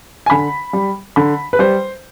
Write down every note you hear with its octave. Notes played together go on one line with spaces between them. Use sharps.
G#5
D3 B5
G3
D3 B5
B4
G3 C5